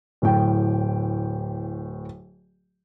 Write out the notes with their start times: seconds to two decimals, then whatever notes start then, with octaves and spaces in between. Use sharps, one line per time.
0.22 D1 A2 G5